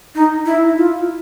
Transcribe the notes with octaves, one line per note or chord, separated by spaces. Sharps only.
D#4
E4
F4